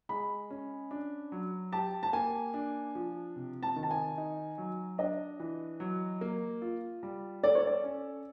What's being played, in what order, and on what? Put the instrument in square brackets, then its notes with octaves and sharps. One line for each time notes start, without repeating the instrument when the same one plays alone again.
[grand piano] G#3 [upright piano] B5
[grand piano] C#4
D4
F#3
[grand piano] G4 [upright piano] A5
[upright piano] A5
[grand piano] A#3 [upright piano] G#5
[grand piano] D4
F3
C3
[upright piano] A5
[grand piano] D#3
[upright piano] A5
G#5
[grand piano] D#4
F#3
[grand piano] D4 [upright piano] D#5
[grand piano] E3
F#3
A#3
F4
G3
[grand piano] A4 [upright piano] D5
[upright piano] C#5
D5
[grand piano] C#4